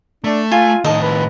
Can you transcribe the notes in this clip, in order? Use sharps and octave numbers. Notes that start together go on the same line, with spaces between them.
A3 D4
F4 G#5
A2 D#3 D#4 D#5 A5
B4